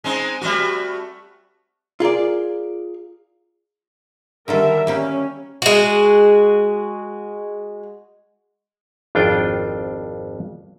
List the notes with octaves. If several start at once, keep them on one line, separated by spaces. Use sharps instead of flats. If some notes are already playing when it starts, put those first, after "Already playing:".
G#3 C4 D#4
G3 A3 F#4
F4 G#4 A#4 D5
D3 D#3 G3 A4 A#4 E5
G3 A#3 C#4 G4
G#3 F#4
G#1 F2 D4 F4 G5